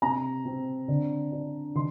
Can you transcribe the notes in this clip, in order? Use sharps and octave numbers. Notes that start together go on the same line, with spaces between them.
C3 A#5
C4
D3
D4
D#3 C6